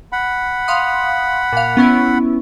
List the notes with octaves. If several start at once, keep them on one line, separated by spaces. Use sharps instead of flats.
F#5 B5
F5 C6 D#6
A#2 F5
B3 C#4 E4